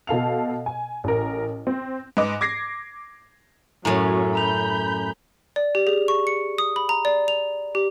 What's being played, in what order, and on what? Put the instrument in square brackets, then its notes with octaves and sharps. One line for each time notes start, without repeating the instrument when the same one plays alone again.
[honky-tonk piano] B2 A4 F5 F7
G#5
A1 A#4
C4
G#2 B4 D#5 D6
D6 G#6 A#6 C7
[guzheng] F#2 A2 [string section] F#3 C#4 [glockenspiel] G#5 A#5
[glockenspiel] A#5 F7 [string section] B5 G6
[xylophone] D5
G4
G#4
C#6
C#7
D#6
B5
A#5
D5
F7
G4